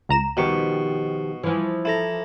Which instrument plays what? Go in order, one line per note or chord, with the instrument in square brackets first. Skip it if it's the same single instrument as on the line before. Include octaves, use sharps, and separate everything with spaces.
[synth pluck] C#2 A#5 E7
[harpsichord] B2 C#6 [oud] D#3 F3 G4
[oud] E3 F3
[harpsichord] E4 A4 A#5